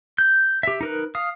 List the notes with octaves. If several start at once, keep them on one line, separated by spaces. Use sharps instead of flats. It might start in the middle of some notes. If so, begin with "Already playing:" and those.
G6
G4 E5
D#4 A#4 B4
F5 D#6